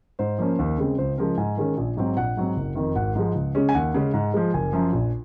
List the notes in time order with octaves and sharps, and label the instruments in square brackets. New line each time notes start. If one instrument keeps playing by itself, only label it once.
[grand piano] G#2 C5
F3 A#3 C#4
D#2
C#3 G#3 C4
C#2 C5
C#3 F3 G#3 A#4
G#2 G#5
D#3 G#3 C#4
A#1
G#2 F#3 C4
A#1 F#5
G#2 F#3 C4
F#1
F2 D#3
G#1 F#5
G#2 F3 G#3
C#2
C#3 G#3 C#4
G#5
D#2 F#5
C#3 G#3 C#4
G#2
F3 G#3
F#1 G#5
F#2 F3
A#1